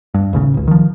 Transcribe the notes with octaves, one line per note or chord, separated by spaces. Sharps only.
G2
D#1 A1 C#3
G#1 C#2
D#3 F3